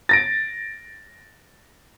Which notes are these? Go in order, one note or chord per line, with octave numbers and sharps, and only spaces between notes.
A6 A#6 D7